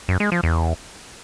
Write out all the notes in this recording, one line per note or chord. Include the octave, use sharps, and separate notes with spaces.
F#2
G#3
F3
E2